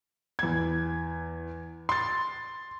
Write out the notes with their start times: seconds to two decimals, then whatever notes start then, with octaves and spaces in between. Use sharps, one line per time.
0.39 E2 G#6
1.89 C6 A6